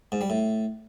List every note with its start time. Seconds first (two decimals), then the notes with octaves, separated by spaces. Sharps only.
0.12 G#2
0.21 G3
0.30 A2